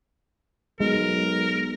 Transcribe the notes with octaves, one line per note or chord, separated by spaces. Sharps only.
B1 G#3 A#4